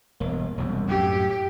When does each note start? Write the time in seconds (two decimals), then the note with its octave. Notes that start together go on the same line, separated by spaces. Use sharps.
0.20 E1 G2 A#3
0.58 E1 C2 F#2
0.89 F#2 A2 G4